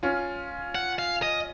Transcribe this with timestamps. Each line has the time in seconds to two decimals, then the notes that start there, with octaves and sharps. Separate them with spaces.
0.03 C#4 F4
0.75 F#5
0.99 F5
1.22 D#5